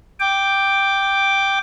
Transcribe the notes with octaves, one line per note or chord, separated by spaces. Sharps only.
G5 D6